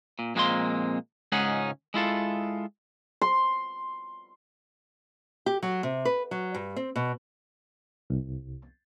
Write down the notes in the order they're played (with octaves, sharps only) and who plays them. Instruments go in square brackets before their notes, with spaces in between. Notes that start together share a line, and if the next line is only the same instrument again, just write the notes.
[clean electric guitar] A#2
F2 A#2 G#3 A#3 C4 C6
C#2 G#2 C#4 D#4 G#4 F#5
G#3 E4 F4 A4
[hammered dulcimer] C6
[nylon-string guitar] G4
F#3
C3
B4
F#3
G2
C4
B2
[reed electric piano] C2